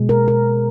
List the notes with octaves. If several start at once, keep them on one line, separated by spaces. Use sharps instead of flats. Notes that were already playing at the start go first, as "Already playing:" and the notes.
Already playing: B2 G#3
A#4
A#4